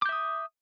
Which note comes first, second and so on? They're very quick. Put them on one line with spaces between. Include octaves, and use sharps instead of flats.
D6 G6 E5 D#6